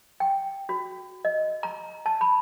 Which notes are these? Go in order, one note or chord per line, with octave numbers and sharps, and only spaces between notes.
G5
F#4
D#5
A#5
A5
B5